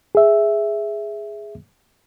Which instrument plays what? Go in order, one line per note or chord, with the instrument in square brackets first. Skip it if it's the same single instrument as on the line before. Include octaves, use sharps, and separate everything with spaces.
[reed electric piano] G#4 E5